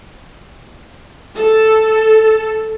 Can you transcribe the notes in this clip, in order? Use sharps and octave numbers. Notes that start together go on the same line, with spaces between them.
A4